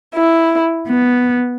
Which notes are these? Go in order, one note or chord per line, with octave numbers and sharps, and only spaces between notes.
E4
B3